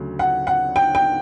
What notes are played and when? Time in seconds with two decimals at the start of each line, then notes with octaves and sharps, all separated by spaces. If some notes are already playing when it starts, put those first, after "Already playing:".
Already playing: D2 C#3 F#3 A3 C#4
0.19 F#5
0.47 F#5
0.76 G5
0.95 G5